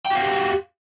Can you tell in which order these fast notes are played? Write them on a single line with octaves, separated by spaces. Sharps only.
G5 F#4 F5 G4